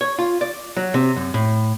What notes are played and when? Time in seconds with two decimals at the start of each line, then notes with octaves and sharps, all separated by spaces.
0.01 C#5
0.19 F4
0.41 D5
0.77 F#3
0.94 C3
1.16 F#2
1.34 A2